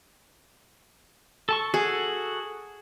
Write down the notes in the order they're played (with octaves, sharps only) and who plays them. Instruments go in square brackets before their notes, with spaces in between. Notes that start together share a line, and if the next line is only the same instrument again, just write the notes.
[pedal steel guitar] A4 A5 C#6
[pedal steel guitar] F#4 A4 [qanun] G#4